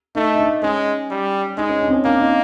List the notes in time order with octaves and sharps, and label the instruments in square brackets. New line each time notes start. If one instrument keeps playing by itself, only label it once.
[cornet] A3 [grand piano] D#4
[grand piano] D#4
D4
[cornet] G#3 [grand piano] C#4
[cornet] G3
[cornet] G#3 [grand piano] D#4
[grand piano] C#4
D4
C4
C#4
[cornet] A#3 [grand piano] D4
[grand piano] D#4